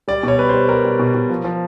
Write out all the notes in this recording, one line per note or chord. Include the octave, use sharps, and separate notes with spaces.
G3 D5
B2 C#5
G3 B4
G3 C5
G3 A#4
G3
B2
B2
F3
F3